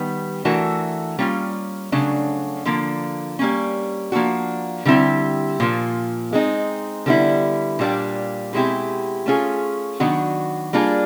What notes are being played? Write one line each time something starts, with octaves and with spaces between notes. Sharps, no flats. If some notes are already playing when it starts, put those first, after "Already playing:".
Already playing: D#3 G3 B3
E3 A3 D4 F#4 A#4
G3 A#3 C#4 F4
C#3 F#3 A3 D4
D3 F3 A#3
G3 A#3 C#4
F3 A#3 D4 F#4
D3 G3 C4 E4 G4
A#2 F3 A#3
G#3 C4 D#4
D3 G3 B3 E4
A#2 G3 A#3 D4 G4
B2 G#3 C4 E4 G4
A3 C#4 F4 G#4
D#3 F#3 B3 D4 F#4
G3 A#3 D4 F4 G#4